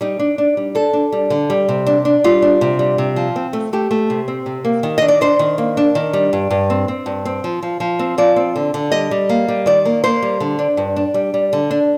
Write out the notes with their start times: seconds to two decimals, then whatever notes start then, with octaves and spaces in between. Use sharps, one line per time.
0.01 G3 D#4
0.19 D4
0.38 D4
0.57 G3
0.75 D4 A4
0.93 D4
1.12 G3
1.30 D3
1.50 G3
1.69 C3
1.86 D4
2.05 D4
2.24 G3 F4
2.42 D4
2.61 C3
2.79 G3
2.98 C3
3.16 F3
3.36 C4
3.53 A3
3.73 A3 G4
3.91 A3
4.10 C3
4.28 C4
4.46 C3
4.65 A#3
4.83 D#3
4.98 D4 D#5
5.08 D5
5.21 D4 C5
5.39 D#3
5.58 A#3
5.77 D4
5.95 D#3
6.13 G3
6.33 G2
6.50 G2
6.70 C4
6.88 C4
7.06 G2
7.25 C4
7.44 F3
7.62 F3
7.80 F3
7.99 C4
8.18 F3 D5
8.36 C4
8.56 D3
8.74 D3
8.92 G3 D#5
9.11 G3
9.29 A#3
9.48 G3
9.66 D#3 D5
9.85 A#3
10.04 A#3 C5
10.22 G3
10.40 D3
10.59 D4
10.77 G2
10.96 D4
11.14 G3
11.34 G3
11.53 D3
11.71 D4